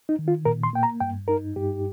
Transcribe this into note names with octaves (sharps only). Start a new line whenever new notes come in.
D#4
D#3
F4
A#2 A#4
C6
A#3 G5
A#5
G2 G5
D#4 A#4
G2 G4